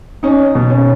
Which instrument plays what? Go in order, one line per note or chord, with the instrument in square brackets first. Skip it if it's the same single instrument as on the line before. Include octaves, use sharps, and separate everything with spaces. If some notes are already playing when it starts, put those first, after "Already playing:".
[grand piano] C#4 [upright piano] D#4
[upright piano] B2
[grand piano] C#4